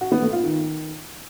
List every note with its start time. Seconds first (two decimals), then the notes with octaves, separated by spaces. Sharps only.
0.01 F#4
0.12 B3
0.22 A3
0.33 F4
0.44 D#3